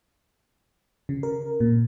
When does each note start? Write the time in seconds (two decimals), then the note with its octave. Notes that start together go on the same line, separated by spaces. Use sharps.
1.09 C#3
1.23 A#4
1.60 A#2